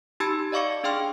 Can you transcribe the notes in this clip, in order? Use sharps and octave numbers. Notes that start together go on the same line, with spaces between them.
D#4 G4 A5 B5 E6 G#6
D5 D#5 F5 C#6 D6 C#7
D4 G#4 F5 G5 C6 F6